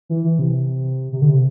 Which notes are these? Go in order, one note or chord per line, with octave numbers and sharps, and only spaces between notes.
E3
E3
C3
C3
D3
C3